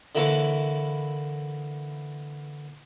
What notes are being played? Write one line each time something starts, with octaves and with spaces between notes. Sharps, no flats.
D3 E3 A#3 E4 C#5 F5